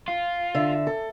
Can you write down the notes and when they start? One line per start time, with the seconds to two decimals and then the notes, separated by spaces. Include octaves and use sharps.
0.08 F4
0.55 D3 E5
0.87 A4